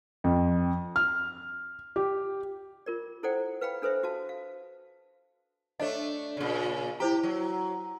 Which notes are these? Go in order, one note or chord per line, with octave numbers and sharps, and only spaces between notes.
F2
F6
G4
F4 A#4 D5
E4 A4 C5 D5 F#5 G5
B4 F5 G5 B5
D4 A4 B4 C5 E5
F#4 F5 A5
F5
A3 D4 C#5 D#5
A#2 C#3
E4 G4 C5 A#5
F#3